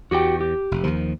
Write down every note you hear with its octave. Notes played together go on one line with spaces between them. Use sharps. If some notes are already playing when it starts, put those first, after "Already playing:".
E2 F#4 G4 G5
G4
F1
D#2 D#3 F3